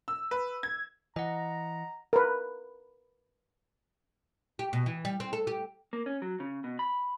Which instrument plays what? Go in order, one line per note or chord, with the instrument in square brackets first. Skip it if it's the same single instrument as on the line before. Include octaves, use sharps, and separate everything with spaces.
[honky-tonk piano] E6
B4
G#6
[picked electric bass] E3 [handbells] D#5 F#5 [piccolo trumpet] A#5
[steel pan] A#4 B4
[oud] G4
B2
E3
G3
C4
A4
G4
[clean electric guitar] A#3
C#4
F#3
C#3
B2
B5